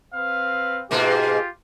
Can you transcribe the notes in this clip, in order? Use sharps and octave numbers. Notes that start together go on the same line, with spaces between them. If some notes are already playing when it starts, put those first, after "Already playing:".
C4 B4 F5
G#2 B2 A#3 F4 G4